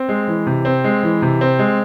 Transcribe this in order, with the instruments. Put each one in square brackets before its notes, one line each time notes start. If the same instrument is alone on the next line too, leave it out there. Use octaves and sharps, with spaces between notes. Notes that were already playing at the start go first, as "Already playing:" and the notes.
Already playing: [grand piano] C4
G#3
E3
C3
C4
G#3
E3
C3
C4
G#3